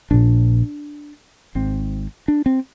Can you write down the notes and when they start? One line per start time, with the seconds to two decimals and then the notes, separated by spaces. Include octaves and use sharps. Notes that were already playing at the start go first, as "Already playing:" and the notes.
0.11 A#1 A#2 D4
1.55 G#1 G#2 C4
2.28 D4
2.46 C4